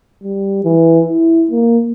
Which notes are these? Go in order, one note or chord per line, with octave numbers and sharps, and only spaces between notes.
G3
E3
E4
A#3